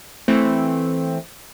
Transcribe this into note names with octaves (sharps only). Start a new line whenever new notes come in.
E3 A3 C4